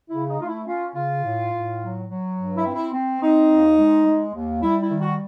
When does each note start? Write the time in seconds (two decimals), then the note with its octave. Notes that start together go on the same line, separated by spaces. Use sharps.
0.10 C#3 E4
0.29 D#4
0.39 A3 F4
0.47 E4
0.67 C#4 F4
0.95 C#3 F4
1.23 A2
1.52 A2
1.80 F#3
2.08 F#3
2.36 G2
2.56 E4
2.65 C4
2.74 E4
2.92 C4
3.21 C4 D#4
3.50 D#2
3.78 G#3
4.06 G#3
4.34 D#2
4.62 G3 E4
4.82 E4
4.91 D#3
5.01 F#4